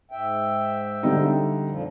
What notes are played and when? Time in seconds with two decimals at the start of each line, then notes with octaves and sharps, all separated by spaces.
0.11 G#2 E5 G5
1.03 D3 G3 D#4
1.68 F2 A#2 F3